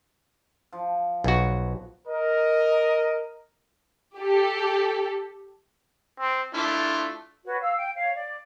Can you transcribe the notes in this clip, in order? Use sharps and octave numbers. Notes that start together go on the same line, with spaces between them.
F3
B1 F#4 B4
A#4 D#5
G4 A4
C4
A3 D4 E4 F4
F#4 B4 C#5
F5 E6
G5
C#5 F5
D5